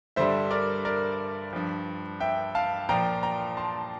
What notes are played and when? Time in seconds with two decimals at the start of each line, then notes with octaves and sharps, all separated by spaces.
0.16 G2 D3 G3 C5 E5
0.51 A#4 D5
0.85 A#4 D5
1.53 G2 F3
2.20 E5 G5
2.55 F5 A5
2.89 A#2 F3 G5 A#5
3.23 G5 A#5
3.57 A5 C6